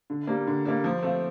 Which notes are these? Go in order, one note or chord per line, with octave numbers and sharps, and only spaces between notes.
D3
G3 A#3
D3
G3 A#3
F3
A3 C4 F4